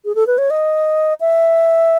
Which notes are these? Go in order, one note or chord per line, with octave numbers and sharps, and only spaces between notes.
G#4
A4
B4
C#5
D#5
E5